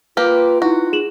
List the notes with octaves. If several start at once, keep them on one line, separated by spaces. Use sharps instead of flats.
A#3 F4 G4 B4
D#4 E4 F#4
G#4 E7 F#7